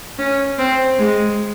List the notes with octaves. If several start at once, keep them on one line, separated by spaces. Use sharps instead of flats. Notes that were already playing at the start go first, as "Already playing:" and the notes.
C#4
C4
G#3